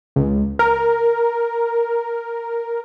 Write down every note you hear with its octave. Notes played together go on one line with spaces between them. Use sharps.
C#2
A#4